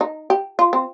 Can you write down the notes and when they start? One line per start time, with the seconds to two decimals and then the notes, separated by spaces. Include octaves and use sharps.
0.01 D#4
0.30 G4
0.59 F4
0.73 C4